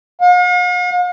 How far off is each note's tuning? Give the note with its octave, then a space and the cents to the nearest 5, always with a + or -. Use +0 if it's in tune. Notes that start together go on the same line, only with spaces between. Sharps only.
F5 +45